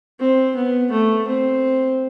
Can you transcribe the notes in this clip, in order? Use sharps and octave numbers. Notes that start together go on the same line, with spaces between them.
C4
B3
A3
C4